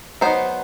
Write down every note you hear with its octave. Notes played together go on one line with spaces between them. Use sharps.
F#3 B3 D#4 C5